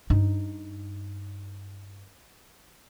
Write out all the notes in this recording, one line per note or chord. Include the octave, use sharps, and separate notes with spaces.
G2 D#4